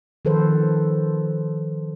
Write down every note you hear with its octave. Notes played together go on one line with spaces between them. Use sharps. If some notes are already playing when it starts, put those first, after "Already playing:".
D#3 F3 A4 B4 C5